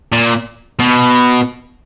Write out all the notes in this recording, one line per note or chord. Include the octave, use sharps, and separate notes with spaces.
A#2
B2